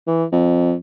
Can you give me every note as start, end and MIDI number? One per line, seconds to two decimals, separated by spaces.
0.07 0.24 52
0.33 0.74 41